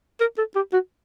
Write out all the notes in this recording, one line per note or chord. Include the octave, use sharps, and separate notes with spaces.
A#4
A4
G4
F#4